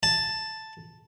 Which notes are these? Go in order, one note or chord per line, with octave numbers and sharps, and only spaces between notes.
A5